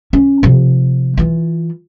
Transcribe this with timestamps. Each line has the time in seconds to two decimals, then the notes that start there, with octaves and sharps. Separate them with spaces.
0.13 C#4
0.43 C3 F3
1.17 E3 F4